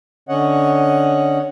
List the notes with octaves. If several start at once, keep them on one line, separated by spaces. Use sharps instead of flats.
D3 C#4 C#5 D#5 F#5